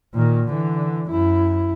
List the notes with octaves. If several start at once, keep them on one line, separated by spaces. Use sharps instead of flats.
A#2 D#3
D3 E3
F#2 E4